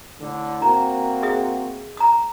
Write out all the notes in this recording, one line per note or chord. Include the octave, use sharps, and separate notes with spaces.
A2 D3
A#3 C4 F#4 A#5
G#4 E5 D#6
A#5 D#6